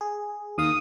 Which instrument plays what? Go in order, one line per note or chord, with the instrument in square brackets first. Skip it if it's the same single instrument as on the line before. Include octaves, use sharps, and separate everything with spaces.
[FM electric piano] G#4
[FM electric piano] D#2 F5 [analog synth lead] D#6